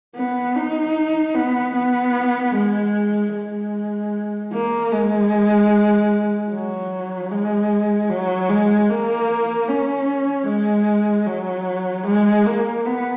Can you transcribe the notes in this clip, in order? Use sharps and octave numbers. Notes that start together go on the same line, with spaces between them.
B3
D#4
B3
B3
G#3
G#3
A#3
G#3
F#3
G#3
F#3
G#3
A#3
C#4
G#3
F#3
G#3
A#3
B3